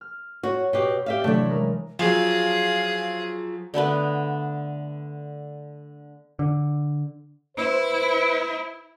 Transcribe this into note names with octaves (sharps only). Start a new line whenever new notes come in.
F6
F#4 C#5
B2 G4
G4 E5 F5
C3 E3 F#3 A3 D4 E4
G#3 A#4
F3 F#3 G#4 F5
D3 A3 B3 B4
D3
E4 B4 C5